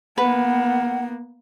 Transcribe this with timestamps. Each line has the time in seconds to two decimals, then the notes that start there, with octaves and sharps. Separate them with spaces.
0.18 A#3 B3 B4 F#5